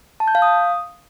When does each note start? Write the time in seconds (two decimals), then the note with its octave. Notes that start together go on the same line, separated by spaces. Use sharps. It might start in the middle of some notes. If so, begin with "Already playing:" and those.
0.20 A5
0.28 G6
0.35 F5
0.42 D#6